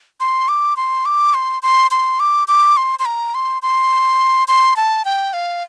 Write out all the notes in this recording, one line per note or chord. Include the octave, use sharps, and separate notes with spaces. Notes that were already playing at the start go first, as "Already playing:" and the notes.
C6
D6
C6
D6
C6
C6
C6
D6
D6
C6
C6
A#5
C6
C6
C6
A5
G5
F5